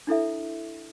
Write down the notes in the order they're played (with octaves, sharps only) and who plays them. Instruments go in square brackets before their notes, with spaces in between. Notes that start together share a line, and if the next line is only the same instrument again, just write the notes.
[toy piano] D4 E4 A4 E5